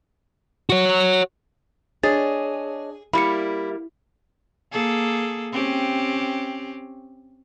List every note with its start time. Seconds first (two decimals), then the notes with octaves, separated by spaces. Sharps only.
0.70 F#4 C#5
2.03 D4 G#4 C#5 D#5 A6
3.13 G3 A#3 E4 B5 C#7
4.72 A#3 G#4 A4
5.52 C4 C#4 G4